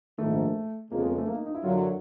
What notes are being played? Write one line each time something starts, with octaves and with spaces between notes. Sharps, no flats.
A#1 G#2 D#3 A3
F2 C#3 F3 G#3 A#3
B3
A#3
A3
A#3
D#4
D#4
E4
F#2 D3 F#3 F4
E4